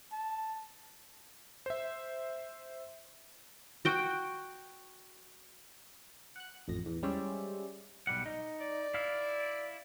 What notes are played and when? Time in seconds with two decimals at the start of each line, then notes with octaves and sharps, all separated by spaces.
0.12 A5
1.66 C5 E5
3.85 F#4 G5
6.36 F#5 F#6
6.68 A1 F2 A#6
6.86 E2
7.03 G3 G#3 C#4 C5 D5 E5
8.07 B1 G3 F#5
8.26 D#4
8.61 D5
8.94 E4 F5